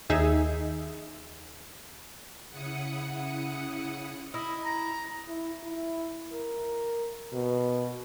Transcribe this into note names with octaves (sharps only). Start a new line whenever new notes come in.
D#2 D#4 G#4 E5
C#3 E4 F#5 D#6 C#7
E4 D#5
A#5
E4
E4
A#4
B2